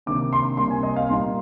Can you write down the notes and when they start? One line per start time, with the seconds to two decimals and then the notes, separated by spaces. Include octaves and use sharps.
0.06 C3 D#3 A#3 D4 D6
0.33 C6
0.57 C3 G3 A#3 C6
0.70 G#5
0.83 D#5
0.96 F5
1.09 A#2 G3 A#3 D#4 C6